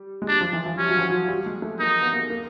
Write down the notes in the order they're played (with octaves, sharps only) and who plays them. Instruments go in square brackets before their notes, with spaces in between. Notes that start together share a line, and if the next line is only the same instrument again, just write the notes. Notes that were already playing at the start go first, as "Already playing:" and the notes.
Already playing: [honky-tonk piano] G3
G#3
[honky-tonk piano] G3 [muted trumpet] D4
[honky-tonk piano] F3
E3
F3
[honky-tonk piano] G3 [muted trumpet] C#4
[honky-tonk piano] F#3
F3
F#3
G3
G#3
A3
[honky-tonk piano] A#3 [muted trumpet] D#4
[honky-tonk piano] B3
A#3
A#3